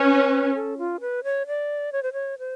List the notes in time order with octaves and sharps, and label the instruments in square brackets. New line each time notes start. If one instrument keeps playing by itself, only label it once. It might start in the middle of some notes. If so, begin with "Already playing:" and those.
Already playing: [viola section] C#4 [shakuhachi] B4
[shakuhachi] A4
F4
B4
C#5
D5
C#5
C5
C#5
C5